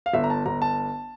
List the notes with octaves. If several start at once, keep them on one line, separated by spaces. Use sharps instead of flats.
F5
G1 E5
A#5
A5
G1 A#5
A5